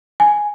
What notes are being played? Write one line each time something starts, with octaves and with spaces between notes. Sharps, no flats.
G#5